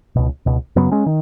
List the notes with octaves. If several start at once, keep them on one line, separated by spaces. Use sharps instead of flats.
C#2 B2
C#2 B2
F#2 C#3 F#3 B3
G#3 C#4
D#3